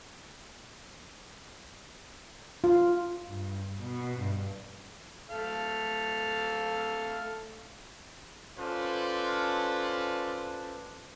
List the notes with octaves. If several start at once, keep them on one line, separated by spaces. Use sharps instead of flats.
F4
G2
B2
G2
A3 A4 F5
C#4 F4 A4 B4 C5 D5